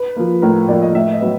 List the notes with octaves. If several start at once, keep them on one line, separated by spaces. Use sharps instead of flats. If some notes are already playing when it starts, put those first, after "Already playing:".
Already playing: B4
F3 A#3
A2 A#4
F3 A#3 D5
D#5
A2 E5
D#5
F#3 B3